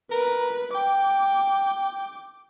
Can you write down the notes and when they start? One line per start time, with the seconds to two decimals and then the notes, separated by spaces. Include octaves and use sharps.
0.11 A#4 B4
0.75 G5 D6